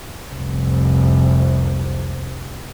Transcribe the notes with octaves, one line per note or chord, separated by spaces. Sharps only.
F1 C2